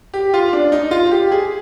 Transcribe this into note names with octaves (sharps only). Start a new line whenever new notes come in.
G4
F4
D4
D#4
F4
G4
G#4